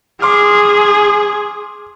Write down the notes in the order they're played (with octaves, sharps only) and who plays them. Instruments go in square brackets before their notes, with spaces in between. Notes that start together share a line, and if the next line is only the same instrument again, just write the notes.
[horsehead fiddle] G#4 [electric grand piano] C6 D6 F6